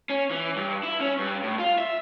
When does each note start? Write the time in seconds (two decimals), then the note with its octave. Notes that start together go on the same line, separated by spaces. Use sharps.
0.10 C#4
0.31 E3
0.56 G2
0.83 E4
1.01 C#4
1.19 G2
1.43 A2
1.59 F4
1.79 E5